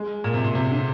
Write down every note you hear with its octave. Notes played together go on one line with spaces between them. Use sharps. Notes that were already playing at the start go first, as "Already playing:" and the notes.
Already playing: G#3
A#2
C3
A#2
C3
D3